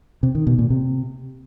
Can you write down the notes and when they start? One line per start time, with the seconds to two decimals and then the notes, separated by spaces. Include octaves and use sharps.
0.23 C3
0.35 D#3
0.47 B2
0.58 A#2
0.70 C3